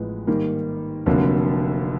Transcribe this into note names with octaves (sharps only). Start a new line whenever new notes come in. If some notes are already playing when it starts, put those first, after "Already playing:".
Already playing: A1 A2 F3 G#3 B3
G#2 D#3 G3 A#3
F1 F2 D3 F#3 A#3